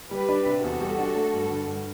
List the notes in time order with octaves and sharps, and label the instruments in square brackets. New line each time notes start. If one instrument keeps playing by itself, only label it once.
[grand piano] G3 [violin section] G4 B4
[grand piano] D4
C3
[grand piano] E2 [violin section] F#4 A4
[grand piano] G3
D4
A3
G2
D3
G2